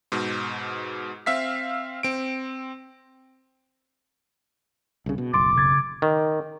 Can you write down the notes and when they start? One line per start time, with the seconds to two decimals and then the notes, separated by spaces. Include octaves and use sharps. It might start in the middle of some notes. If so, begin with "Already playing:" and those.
0.12 G#2 B2
1.26 C4 E5 F5 B6
2.03 C4 D7
5.06 C2 C#3
5.18 B2
5.33 F#1 B1 C6 D6 A6
5.56 C#3 G#6 A6
6.02 D#3